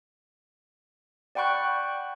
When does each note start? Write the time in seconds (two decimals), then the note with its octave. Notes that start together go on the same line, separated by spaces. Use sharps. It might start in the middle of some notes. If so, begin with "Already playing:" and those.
1.35 D5 F#5 G5 B5 C#6 F#6